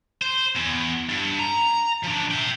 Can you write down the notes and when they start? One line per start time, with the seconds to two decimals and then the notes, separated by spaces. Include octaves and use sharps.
0.22 C5
0.56 E2
1.09 G2
1.39 A#5
2.04 F3 D4
2.31 E5 G5